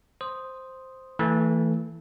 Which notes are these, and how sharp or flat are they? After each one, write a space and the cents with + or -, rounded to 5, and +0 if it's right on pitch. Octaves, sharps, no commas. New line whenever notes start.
C5 +0 D#6 +0
E3 +0 A3 +35 A4 -5